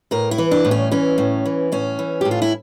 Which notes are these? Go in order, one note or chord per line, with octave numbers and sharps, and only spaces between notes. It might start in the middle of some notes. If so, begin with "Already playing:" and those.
A2 A#4
E4
E3
D4
A2
C#4
E3 C#4
A2
E3
A2 C#4
E3
A2 G4
F4
E4